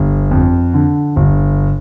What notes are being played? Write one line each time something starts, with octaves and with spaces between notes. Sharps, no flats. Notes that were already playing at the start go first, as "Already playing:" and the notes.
Already playing: G1
F2
D3
G1